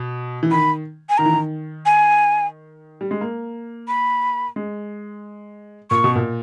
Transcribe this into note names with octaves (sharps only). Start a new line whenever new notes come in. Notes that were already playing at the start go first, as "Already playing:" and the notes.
Already playing: B2
E3
D#3 B5
G#5
D#3 A#5
E3
D#3
G#5
G3
G#3
A#3
B5
G#3
A#2 C#6
B2
A#2